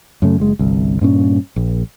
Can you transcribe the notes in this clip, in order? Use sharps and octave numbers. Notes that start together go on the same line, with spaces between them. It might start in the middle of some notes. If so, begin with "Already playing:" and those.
F#2 C#3 A3
F#1 G#3
G1 C2
G2 A#2 C#4
A#1